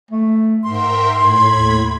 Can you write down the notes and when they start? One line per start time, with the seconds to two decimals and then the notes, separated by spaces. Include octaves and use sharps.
0.11 A3
0.63 G#2 A#4 E5 G5 C6
1.14 A2 B5 G#6
1.51 D#2